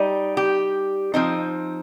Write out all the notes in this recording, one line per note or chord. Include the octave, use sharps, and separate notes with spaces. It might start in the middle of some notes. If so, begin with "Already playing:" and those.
Already playing: G3 D#4
G4
F3 C4 D#4